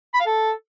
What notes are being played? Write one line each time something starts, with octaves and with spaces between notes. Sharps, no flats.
B5
F5
A4